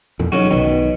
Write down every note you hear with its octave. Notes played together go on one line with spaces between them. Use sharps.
E1 F2 A#2
B1 C#3 F#3 F#4
B1 B2 D#3